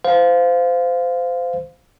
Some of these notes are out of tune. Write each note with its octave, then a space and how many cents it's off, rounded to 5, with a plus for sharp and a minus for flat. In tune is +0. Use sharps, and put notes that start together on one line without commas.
C5 -25 F5 +5